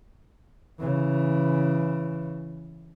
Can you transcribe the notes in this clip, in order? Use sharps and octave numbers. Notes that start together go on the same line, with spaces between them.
C#3 E3